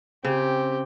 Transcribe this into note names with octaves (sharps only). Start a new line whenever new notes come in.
C#3 C4 G4